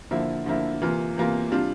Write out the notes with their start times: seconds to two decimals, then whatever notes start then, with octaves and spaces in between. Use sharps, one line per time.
0.11 D3 F3 A#3 E4
0.46 D3 F3 A#3 E4
0.82 C3 E3 A#3 F4
1.16 C3 E3 A#3 F4
1.52 C3 G3 D4 F4